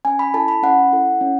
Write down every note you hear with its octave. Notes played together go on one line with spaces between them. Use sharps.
C#4 G#5
B5
E4 A4 A5
B5
C#4 F#5
E4 A4
C#4